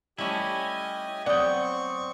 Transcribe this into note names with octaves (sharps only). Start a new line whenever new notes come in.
G3 A3 C#4 E4 G4 D#5 G#5
F#3 B3 C4 D5 F#5 G5 C#6 D#6